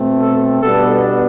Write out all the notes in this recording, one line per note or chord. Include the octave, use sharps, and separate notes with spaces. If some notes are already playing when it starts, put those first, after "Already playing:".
Already playing: B2 A3 C4
A4
B2 G3 B3 D4 A4